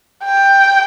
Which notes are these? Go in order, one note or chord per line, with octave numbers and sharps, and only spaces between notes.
G5